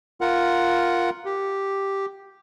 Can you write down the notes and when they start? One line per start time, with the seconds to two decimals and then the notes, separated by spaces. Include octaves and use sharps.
0.21 F4 A#4 F#5
1.25 G4